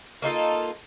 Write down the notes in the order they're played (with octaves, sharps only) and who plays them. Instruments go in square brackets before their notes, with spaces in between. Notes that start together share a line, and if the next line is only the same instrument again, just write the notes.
[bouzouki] A#3 D#4 F4 A4